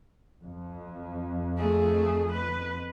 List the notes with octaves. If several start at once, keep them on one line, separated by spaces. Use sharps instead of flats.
F2
A3 G#4
B4